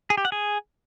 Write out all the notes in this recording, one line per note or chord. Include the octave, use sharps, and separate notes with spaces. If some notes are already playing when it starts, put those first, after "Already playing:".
G#4
G4
F#5
G#4